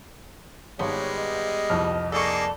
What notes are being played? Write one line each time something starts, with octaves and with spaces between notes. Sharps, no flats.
G#1 G3 G#3 B3 C#5 A5
D#5
C2 F2 F6
A#3 D#4 G#4 A4 D5 C#6